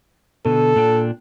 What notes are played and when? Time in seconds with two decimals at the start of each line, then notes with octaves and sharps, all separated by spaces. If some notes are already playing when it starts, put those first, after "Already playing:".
0.45 B2 D3 A4
0.76 A#2 D4 G5